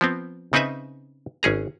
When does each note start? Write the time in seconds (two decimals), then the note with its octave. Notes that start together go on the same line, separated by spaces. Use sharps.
0.01 F3 B3 C4
0.53 C#3 C4 D#4 B4 E5 G#5
1.43 G#1 C#4 G#4 A#5